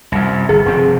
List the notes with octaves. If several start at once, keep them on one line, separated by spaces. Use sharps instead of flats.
C2 F#2
G1 G#4
F1 C4